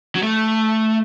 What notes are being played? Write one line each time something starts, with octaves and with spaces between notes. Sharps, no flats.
F#3
A3